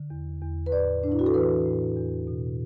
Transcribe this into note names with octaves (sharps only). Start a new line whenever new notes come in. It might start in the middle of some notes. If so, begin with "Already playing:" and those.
Already playing: D3
E2
E2
B4
A2 D5
A2 D4
E4
F#4
A4
E3 B4
A2
E2
B2